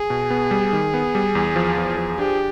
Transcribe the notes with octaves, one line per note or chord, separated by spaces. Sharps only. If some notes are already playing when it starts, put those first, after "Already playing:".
Already playing: G#4
B2
B3
G3
D#3
B3
G3
E2
F3
E2
F3
D4 G4